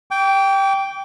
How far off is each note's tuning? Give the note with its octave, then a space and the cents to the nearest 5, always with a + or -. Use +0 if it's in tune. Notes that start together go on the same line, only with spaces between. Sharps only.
G5 +0 D6 -40